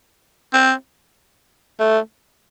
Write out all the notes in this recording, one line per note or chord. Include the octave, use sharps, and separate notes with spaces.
C4
A3